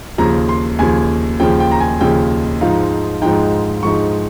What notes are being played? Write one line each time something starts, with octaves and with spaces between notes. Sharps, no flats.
D#2 C#3 F3 A#5
C6
D#2 C#3 F3 G#5
D#2 C#3 F3 G5
G5
A#5
G#5
D#2 C#3 F3 G5
G#2 F3 G#3 D#4 F5
G#2 F3 G#3 D#4 G5
G#2 F3 G#3 D#4 C#6